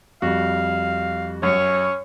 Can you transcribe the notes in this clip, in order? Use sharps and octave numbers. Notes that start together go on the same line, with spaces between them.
F2 G3 F#4 F5
F#2 C#4 C#5